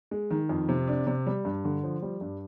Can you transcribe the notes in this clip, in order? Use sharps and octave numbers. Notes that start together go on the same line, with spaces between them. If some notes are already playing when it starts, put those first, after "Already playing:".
G#3
D#3
F2
C3
D4
C3
G3
G2
D3
F3
G3
G2